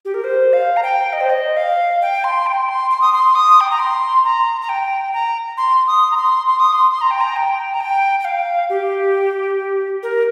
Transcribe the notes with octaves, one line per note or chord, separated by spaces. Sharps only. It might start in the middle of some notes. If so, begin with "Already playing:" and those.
G4
A#4
C5
F5
A#5
G5
D#5
C5
D#5
F5
G5
C6
G5
C6
C6
D#6
C6
D#6
G5
A#5
C6
A#5
A#5
G5
A#5
C6
D#6
A#5
C6
C6
D#6
C6
C6
A#5
G5
A#5
G5
A#5
G5
G5
F5
G4
A#4